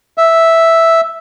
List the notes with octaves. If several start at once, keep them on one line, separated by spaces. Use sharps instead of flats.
E5